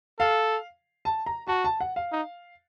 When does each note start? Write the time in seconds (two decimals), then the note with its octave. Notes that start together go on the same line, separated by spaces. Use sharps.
0.19 A4 F5
1.05 A5
1.26 A#5
1.47 F#4 A5
1.64 A5
1.80 F#5
1.96 F5
2.12 D#4